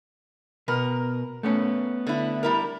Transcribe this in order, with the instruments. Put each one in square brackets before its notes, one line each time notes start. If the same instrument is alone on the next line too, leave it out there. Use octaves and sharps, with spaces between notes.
[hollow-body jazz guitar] B2 B4 [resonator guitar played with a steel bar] A#4
[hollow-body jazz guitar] A3 B3 C#4
[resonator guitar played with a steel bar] D3 E4
G3 E4 A#4